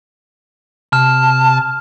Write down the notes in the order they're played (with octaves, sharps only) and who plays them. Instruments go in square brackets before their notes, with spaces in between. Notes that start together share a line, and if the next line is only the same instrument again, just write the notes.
[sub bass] C3 [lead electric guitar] A5 [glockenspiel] F6